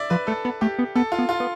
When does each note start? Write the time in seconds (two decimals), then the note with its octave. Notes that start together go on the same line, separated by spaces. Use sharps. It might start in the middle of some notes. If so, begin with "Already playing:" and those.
Already playing: D5 E5
0.10 F3 B4
0.27 A3 A4
0.45 B3
0.61 A3 G4
0.79 B3
0.95 B3 A4
1.12 F4
1.19 B3
1.29 F4
1.40 B3